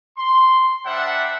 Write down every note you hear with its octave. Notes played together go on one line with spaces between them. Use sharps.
C6
G3 D4 C5 E5 F#5